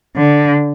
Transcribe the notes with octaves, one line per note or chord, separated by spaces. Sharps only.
D3